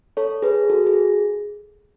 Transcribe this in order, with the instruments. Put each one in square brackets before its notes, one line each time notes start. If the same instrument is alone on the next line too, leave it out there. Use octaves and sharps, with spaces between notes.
[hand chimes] A4 C#5
G#4 B4
F#4 A4
G#4